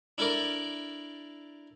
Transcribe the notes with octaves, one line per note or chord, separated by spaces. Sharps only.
D4 E4 A4 A#4 D5